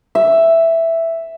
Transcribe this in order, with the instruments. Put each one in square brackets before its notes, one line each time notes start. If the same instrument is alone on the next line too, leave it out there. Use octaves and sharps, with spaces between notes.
[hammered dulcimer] E5